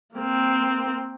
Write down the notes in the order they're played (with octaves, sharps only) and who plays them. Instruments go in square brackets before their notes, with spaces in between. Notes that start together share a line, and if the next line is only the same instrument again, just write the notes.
[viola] A#3 C4